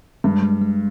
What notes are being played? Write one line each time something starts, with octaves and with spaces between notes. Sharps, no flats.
G2 G#3
G#3
G#3